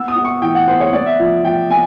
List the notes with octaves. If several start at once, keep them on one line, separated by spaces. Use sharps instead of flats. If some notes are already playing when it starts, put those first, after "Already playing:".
Already playing: B3 E6
D#6
B3
C#6
E3 G5
F#5
B3 C5
C#5
B3 D5
E5
F3
F3 G5
B3 G#5